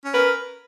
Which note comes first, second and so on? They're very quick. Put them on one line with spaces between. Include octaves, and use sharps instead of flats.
C#4 A#4 B4